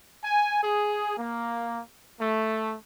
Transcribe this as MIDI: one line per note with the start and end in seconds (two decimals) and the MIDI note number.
0.24 0.61 80
0.63 1.14 68
1.18 1.81 58
2.20 2.76 57